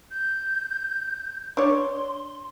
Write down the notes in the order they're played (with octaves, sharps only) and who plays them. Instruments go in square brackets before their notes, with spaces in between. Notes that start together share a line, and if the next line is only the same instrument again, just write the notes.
[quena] G6
[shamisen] D4 C#5 [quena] C6